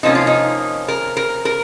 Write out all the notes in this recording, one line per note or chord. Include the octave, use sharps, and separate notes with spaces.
C3 F3 A#3 C#4 D#4
F4
D#4
A#4
A#4
A#4